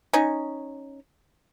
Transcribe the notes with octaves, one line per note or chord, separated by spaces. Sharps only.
C#4 D#4